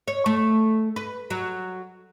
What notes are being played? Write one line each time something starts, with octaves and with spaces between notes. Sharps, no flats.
C#5
A3
B4
F#3